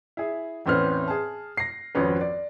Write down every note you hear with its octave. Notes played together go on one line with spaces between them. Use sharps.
E4 G#4
E2 A2 C4 C#4 B4 F6
G#4 A5
A#6 C7
G#1 F2 C#4 B4
D5